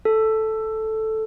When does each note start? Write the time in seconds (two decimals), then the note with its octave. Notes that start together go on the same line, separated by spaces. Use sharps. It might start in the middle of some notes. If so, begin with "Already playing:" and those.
0.05 A4